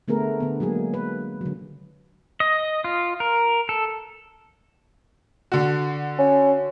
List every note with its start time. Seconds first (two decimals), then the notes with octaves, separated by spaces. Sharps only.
0.08 D3 A3 B3 G#4 A#4
0.40 D3 B3
0.60 F#3 G#3 A#3 G#4
0.94 B4
1.41 D3 F#3
2.40 D#5
2.84 F4
3.20 A#4
3.69 A4
5.52 D3 F#4
6.18 C#4